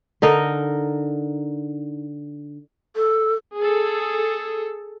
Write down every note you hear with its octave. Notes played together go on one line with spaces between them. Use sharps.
D3 D#4 A#4 D#5
A4
G#4 A4